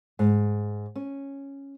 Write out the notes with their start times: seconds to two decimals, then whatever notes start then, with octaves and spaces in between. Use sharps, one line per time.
0.19 G#2
0.96 C#4